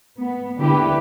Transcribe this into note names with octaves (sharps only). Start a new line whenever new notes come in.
B3
D3 E4 G4 B4